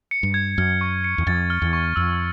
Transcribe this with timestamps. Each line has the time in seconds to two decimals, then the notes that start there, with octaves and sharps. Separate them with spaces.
0.11 C#7
0.23 G2
0.34 G#6
0.58 F#2 F6
0.81 C#6
1.04 C#7
1.18 E2
1.27 F2 A6
1.50 F6
1.62 E2
1.73 C#6
1.96 F2 E6